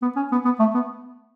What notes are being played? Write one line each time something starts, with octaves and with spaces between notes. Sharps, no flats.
B3
C#4
B3
B3
A3
B3